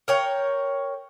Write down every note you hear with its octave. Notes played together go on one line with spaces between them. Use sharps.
A#4 C#5 G5